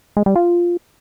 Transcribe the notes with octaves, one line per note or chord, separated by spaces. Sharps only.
G#3
G3
F4